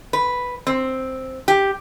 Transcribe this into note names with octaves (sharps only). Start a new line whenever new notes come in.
B4
C4
G4